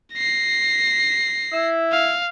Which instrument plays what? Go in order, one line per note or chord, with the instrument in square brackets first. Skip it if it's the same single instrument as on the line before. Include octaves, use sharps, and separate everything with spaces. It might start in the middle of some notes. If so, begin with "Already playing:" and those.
[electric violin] A#6 C7
[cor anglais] E4
[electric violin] F5